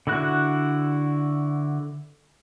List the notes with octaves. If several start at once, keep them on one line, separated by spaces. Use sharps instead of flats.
D3 E4 F#4 F#6